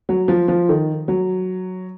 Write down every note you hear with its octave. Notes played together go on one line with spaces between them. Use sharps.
F#3
F3
F3
D#3
F#3